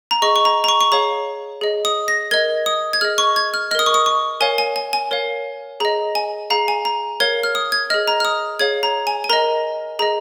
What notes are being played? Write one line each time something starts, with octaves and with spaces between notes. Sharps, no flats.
A#5
G#4 D#5 C#6
C#6
A#5
A#5
C#6
C#6
G#4 C#5 F5 A#5
G#4 D#5
D#6
A#6
A#4 D#5 G#6
D#6
G#6
G#4 D#5 F6
C#6
G#6
F6
A#4 D#5 D#6 F6
C#6
D#6
C#6
A#4 C#5 F5 G#5
G#5
G#5
G#5
A#4 C#5 F5
G#4 D#5 A#5
G#5
G#4 F5 A#5
G#5
A#5
A#4 C#5 F5 G#6
F6
D#6
G#6
G#4 D#5 F6
A#5
F6
D#6
G#4 C#5 F5 G#6
A#5
G#5
G#5
A#4 D#5 A#5
G#4 D#5 A#5